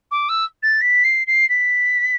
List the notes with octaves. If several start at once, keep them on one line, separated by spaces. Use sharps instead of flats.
D6
E6
A6
B6
C7
C7
B6